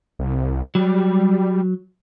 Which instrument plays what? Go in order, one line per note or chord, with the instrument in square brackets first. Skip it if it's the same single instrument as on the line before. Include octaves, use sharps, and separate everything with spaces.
[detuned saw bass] C2
[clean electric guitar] F#3 [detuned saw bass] G3